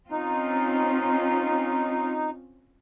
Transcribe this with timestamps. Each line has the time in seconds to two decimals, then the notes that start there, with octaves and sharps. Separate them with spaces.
0.11 C4 C#4 D#4 F4